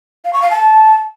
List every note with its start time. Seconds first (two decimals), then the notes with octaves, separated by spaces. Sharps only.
0.25 F5
0.33 C#6
0.42 F5
0.50 A5